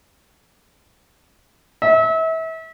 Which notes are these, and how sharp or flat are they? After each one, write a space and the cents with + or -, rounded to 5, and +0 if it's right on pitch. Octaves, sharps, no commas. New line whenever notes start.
E5 -30